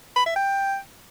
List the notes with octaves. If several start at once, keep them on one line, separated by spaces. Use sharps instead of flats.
B5
E5
G5